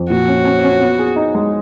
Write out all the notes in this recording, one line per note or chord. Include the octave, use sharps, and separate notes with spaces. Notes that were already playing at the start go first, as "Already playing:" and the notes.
Already playing: F2
A#2 F#4
C#4
C#4
C#4
B3
G#4
D#4
G#3